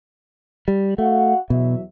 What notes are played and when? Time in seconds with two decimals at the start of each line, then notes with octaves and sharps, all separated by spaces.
0.68 G3
0.98 A3 F#4 F5 F#5
1.50 E2 B2 F#3 E5